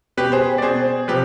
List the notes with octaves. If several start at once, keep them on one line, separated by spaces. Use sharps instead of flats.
B2 G4 B4
G#4 C5
D5
B2 G#4 C5
C3 F3 G4 B4